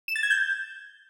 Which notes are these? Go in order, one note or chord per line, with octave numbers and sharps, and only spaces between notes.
E7
A6
G#6
G6